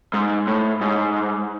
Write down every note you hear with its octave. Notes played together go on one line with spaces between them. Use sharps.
G#2
A2
G#2